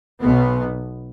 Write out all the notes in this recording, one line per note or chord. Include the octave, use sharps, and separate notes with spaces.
B1 B2 B3